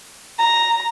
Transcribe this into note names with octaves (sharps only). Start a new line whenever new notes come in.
A#5